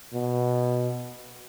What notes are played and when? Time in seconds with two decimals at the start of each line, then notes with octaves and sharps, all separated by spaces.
0.13 B2